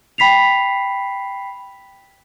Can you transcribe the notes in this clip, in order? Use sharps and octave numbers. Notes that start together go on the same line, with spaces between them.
G5 B5 B6 C7 F7